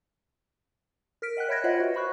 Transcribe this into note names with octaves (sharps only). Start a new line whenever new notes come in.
A#4 F6 B6 D7
D#5 F#5 G5 F#6
C#5 E5 B5 F#6 G#6 A#6
F4 C5 C#5 D#5 E5 F#5
F#4 B4
C5 E5 B5 C#6 F#6